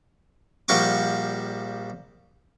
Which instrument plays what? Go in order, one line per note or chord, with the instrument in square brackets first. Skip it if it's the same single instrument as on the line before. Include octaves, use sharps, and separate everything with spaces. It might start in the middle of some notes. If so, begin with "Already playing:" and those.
[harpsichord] A#1 F3 G3 F#4 C#6 D6